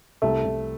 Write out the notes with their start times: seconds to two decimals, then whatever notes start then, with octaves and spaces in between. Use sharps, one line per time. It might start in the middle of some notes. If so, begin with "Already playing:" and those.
0.22 C2 A3
0.45 C2